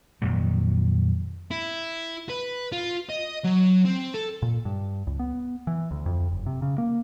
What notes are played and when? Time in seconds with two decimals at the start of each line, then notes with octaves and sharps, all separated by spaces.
0.22 F2 A#2 D#3 F#3
1.51 E4
2.30 B4
2.72 F4
3.09 D#5
3.44 F#3
3.85 C4
4.14 A4
4.42 A#2
4.65 G2
5.07 C#2
5.19 B3
5.67 E3
5.91 D2
6.06 F2
6.31 F#1
6.46 C3
6.62 C#3
6.78 A#3